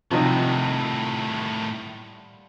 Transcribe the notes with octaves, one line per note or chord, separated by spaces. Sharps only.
A2 C3 D#3 F3 G3 D#4 F4 F#5